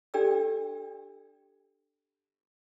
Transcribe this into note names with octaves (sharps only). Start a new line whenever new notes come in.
D4 G4 A4 D5 G5 E6